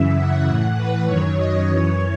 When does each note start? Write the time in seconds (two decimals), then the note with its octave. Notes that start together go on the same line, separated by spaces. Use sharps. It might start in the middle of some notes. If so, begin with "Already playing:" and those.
Already playing: F#2 C#3 E3 E5
0.16 F#5
0.46 A2 E3 F#5
0.77 B4
1.06 F#2 D#3 F#3 C#5
1.37 D#5
1.66 F#2 E3 C#5